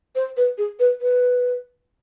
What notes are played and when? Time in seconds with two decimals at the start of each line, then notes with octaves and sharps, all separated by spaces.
0.15 C5
0.37 B4
0.58 G#4
0.80 B4
1.01 B4